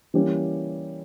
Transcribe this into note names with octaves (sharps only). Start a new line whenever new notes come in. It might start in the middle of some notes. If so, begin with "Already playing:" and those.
E3 G3 A#3 C#4 G4